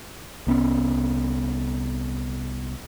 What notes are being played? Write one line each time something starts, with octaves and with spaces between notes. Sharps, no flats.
C2 B3 C#4